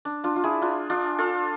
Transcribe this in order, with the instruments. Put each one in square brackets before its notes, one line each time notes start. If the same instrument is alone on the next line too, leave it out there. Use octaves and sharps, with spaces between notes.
[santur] D4
D4 F4
F4
E4 G#4
D4 F4
D4 F4
F4 A4